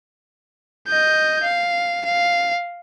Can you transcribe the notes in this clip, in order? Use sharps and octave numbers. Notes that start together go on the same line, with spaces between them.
D#5 G6
F5
F5